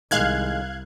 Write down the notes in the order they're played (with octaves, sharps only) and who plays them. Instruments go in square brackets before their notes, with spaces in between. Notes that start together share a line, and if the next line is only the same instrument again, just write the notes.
[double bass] C2 [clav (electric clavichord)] D#3 G#3 [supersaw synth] F5 F#6 G#6